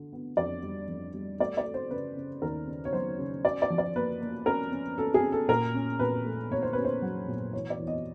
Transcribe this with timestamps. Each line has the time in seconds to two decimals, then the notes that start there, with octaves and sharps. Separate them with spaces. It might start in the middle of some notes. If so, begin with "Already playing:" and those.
Already playing: D3
0.13 B3
0.37 F2 D5
0.63 G3
0.88 F2
1.14 G3
1.39 A3 D5
1.57 D5
1.65 A3
1.74 C5
1.91 C#3 B4
2.17 C#3
2.42 D#2 A#4
2.67 C#3
2.85 C#5
2.93 F#3 C5
3.19 C#3
3.44 C#4 D5
3.62 D5
3.70 F3
3.78 D5
3.96 A#3 B4
4.20 A#3
4.46 C#4 A#4
4.72 C#4
4.98 C#4 A4
5.14 G#4
5.23 C#4
5.32 A4
5.49 A#2 A#4
5.75 C#4
5.99 A#2 B4
6.25 A3
6.51 A#2 C#5
6.62 C5
6.73 C#4 B4
6.85 C5
7.02 F#3
7.28 A#2
7.53 E3 C#5
7.70 D5
7.78 E2
7.87 D#5